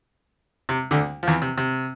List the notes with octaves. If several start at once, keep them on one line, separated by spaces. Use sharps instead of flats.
C3
D2 D3
F3
E2 E3
C3
C3